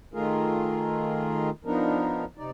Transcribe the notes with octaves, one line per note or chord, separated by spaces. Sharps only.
D#3 A3 F4 G#4 A#4
F3 B3 D4 D#4 A#4
C3 D#4 D5